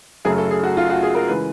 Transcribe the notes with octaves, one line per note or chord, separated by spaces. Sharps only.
F#2 C#3 F#3 A3 G#4
A4
G#4
F#4
F4
F#4
G#4
A#4
C#3 E3 G#3 B4